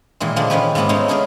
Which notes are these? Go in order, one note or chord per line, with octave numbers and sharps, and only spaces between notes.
A#2 D#3 E3 G#3
A#2 D3 F3 G#3 A#3 D4
D#3 F3 C#4 G4 B4
G#2 C3 A#3 B3 A5 A#5
G#3 A3 C#4 D#4 C#5
B3 C#4 D4 G#4 A#4